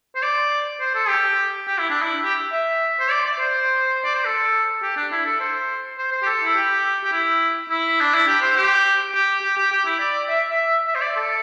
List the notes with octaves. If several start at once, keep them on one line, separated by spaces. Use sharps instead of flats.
C5
D5
C5
A4
G4
G4
E4
D4
E4
G4
E5
C5
D5
D5
C5
D5
C5
A4
G4
D4
E4
A4
C5
C5
C5
G4
A4
E4
G4
G4
E4
E4
D4
E4
G4
C5
G4
G4
G4
G4
G4
E4
D5
E5
E5
E5
C5
D5
A4